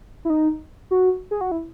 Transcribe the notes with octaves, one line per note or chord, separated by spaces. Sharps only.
E4
D#4
F#4
G#4
F#4
E4